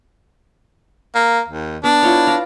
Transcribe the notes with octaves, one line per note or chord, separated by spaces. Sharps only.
A#3
D#2
B3 D4
E4 F4 C#5
D5 F5 A#5